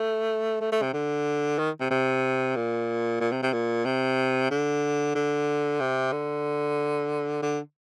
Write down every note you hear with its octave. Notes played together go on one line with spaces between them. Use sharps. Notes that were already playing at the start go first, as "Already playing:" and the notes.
Already playing: A3
A3
A3
C3
D3
D#3
C3
C3
A#2
A#2
C3
C3
A#2
C3
D3
D3
C3
D3
D3